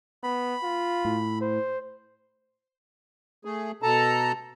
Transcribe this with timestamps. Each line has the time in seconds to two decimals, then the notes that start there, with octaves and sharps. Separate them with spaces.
0.23 B3 B5
0.64 F4
1.05 A2
1.42 C5
3.45 A3 G#4
3.82 B2 A4 A5 A#5